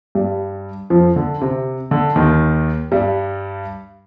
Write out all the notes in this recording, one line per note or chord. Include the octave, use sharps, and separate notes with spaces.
G2 G3
F2 F3
D3
C3
D3
D#2 D#3
G2 G3